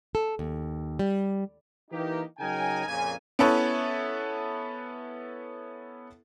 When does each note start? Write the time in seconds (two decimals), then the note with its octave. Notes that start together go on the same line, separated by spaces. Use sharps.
0.15 A4
0.39 D#2
0.99 G3
1.91 E3 A#3 D#4 G4
2.39 C#3 F#3 D#4 A#4 G5 G#5
2.87 F2 A#2 C#3 G#5
3.39 B3 C#4 E4 A4 B4 C#5